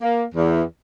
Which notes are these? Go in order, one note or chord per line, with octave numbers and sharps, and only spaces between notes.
A#3
E2